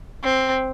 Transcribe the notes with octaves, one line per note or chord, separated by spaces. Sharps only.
C4